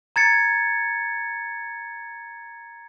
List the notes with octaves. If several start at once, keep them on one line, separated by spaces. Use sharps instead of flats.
A#5 G#6 A6 C#7